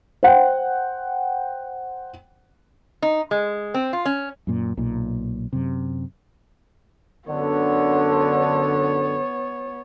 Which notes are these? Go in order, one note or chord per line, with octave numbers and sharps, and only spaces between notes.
C5 F#5 G5
D#4
G#3
C4
F4
C#4
F#2 A#2
B1 A#2
F#2 C3
F#2 D3 B3 C#5